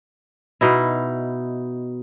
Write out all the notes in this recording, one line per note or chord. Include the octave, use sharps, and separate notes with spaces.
B2 D#4 E4